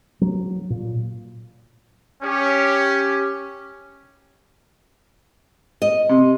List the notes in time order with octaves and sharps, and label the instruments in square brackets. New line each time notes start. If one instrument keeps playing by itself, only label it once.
[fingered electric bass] F#3
A#2
[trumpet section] C#4 G4
[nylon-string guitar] D#5
[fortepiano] C3